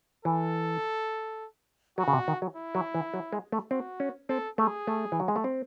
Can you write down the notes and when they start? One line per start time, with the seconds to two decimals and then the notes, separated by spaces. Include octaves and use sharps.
0.25 E3 A4
1.98 F#3 F#4
2.08 C#3
2.13 C3
2.28 D#3
2.42 F#3
2.55 E4
2.75 F#3
2.95 E3
3.14 F#3
3.33 G#3
3.52 A3
3.71 C4 F#4
4.00 C#4
4.29 C4 A4
4.58 A3 G#4
4.87 A3
5.12 E3
5.20 F#3
5.28 G#3
5.36 A3
5.44 C4